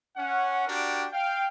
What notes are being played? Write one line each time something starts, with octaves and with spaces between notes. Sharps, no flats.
C#4 F#5
D4 F#4 G4 A#4 D5 G5
F5 G5